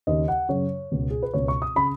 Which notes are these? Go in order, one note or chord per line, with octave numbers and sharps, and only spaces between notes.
D#2 C#3 D#5
F#5
F#2 C#3 C#5
C#2 B2
G#4
B4
C#2 B2 C#5
C#6
D#6
C#3 B5